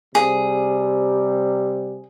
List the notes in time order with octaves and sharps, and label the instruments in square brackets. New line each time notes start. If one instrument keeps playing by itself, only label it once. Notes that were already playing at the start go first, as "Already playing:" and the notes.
[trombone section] C3 G3 [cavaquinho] G#4